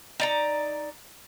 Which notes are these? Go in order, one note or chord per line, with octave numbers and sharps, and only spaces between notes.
D#4 D5 A#5